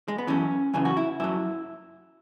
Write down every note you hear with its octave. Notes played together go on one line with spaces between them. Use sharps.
G#3
B3
F#2 E3 C#4
F#2 C#3 E3 G#4
F#4
E4
F#2 F#3 E4